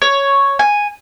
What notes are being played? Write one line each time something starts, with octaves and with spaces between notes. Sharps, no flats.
C#5
G#5